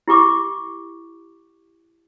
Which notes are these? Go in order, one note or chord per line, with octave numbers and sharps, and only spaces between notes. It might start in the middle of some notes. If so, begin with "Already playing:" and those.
E4 G4 C#6 D6